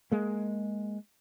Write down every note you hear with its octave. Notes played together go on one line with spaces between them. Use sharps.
G#3 A#3